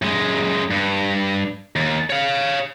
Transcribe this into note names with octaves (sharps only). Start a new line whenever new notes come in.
F#2 G#3
G2
D#2
C#5 F5